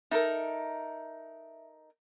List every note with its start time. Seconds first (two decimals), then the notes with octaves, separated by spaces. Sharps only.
0.11 D#4 A4 A#4 E5